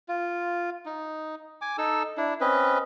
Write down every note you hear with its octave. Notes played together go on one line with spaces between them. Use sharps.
F4
D#4
G#5 D6
D#4 A4 E6
D4 E4
C4 C#4 B4 D#5